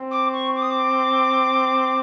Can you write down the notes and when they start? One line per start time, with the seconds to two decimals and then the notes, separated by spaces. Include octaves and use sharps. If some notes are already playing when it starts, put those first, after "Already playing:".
Already playing: C4
0.11 D6
0.33 C#6
0.55 D6
0.62 D#6
0.70 D6